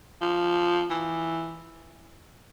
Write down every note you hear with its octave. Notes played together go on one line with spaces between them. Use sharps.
F3
E3